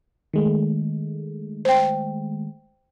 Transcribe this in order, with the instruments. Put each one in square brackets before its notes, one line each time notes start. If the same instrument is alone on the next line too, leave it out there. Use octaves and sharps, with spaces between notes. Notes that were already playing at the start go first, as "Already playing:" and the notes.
[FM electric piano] D#3 G#3 A3
[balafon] C5 G5